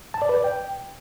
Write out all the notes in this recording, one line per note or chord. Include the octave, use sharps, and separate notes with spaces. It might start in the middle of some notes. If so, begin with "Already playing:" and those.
A5
D5
B4
D5
G5